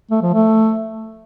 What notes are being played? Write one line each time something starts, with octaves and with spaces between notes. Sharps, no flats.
A3
F3
A3